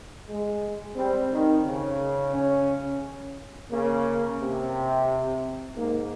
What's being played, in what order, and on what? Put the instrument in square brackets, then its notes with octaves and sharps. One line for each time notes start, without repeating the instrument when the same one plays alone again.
[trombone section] G#3
[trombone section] G3 [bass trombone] C4
[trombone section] D#3
C#3
[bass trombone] C#4
[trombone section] C#3 [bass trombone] A#3
[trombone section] C3
[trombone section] G#2 [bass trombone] A#3